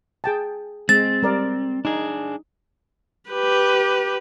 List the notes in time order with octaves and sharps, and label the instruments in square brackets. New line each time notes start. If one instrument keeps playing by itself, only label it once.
[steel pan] G#4 G5 A5
[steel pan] G#3 [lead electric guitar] C4 [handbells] A6
[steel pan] G3 A#4 D5
[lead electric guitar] D4 G#4 [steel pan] D#4
[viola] G4 B4